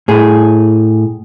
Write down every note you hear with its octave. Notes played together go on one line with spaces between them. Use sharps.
A2 G#4